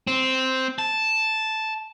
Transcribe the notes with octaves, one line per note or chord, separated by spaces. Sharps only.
C4
A5